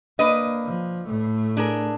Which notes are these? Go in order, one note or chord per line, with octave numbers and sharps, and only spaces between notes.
A#3 D4 B4 D#5
F3
A2 A3
D4 G#4 A#4